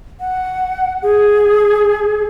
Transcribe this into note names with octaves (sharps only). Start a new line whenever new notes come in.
F#5
G#4